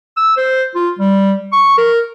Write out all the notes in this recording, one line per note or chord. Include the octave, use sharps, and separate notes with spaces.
E6
C5
F4
G3
C#6
A#4